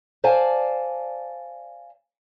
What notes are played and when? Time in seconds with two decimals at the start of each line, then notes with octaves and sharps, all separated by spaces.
0.24 C5 D5 F5 G#5 A5